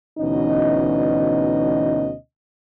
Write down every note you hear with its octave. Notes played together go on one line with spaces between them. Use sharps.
D2 B2 E3 C#4 D#4 D#5